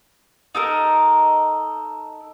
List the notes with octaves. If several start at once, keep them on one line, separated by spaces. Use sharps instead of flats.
D#4 A4 A#4